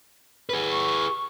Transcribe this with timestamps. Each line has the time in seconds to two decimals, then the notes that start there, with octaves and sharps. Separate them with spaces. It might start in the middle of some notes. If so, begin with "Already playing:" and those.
0.49 G#4 B4
0.72 C#6